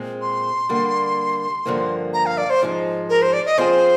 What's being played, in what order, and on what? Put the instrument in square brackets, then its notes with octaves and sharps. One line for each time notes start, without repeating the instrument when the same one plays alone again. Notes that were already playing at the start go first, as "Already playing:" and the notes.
Already playing: [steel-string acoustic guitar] A#2 G#3 C4
[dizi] C6
[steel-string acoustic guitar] D3 G3 A#3
G2 D3 F3 A#3
[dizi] A#5
F5
D5
C5
[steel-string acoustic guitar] G#2 F3 G#3 D#4
[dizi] A#4
C5
D5
D#5
[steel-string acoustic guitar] F3 C4 F4 G#4 [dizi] C5